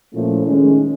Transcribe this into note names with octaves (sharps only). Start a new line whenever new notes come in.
A#2 F3 A3 C#4 E4
D#3 G#3 C#4